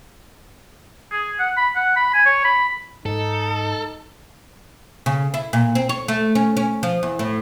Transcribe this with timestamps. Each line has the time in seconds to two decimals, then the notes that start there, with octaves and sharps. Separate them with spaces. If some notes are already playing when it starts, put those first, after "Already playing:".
1.11 G#4
1.39 F#5
1.57 B5
1.75 F#5
1.96 B5
2.14 G#5
2.26 C#5
2.44 B5
3.06 G#2 D#4 A4
5.06 C#3
5.34 E4
5.53 A#2
5.75 C4
5.89 C#5
6.08 A3
6.35 C#4
6.57 C#4
6.83 F3
7.03 E2
7.19 A2